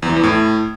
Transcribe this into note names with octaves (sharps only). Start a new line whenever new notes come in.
E2
E3
E2
A2